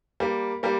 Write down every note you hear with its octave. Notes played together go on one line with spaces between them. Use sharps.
G3 A#3
G3 A#3